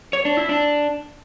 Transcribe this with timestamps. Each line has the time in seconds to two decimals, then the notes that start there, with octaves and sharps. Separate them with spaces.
0.13 C#5
0.25 D4
0.37 E4
0.49 D4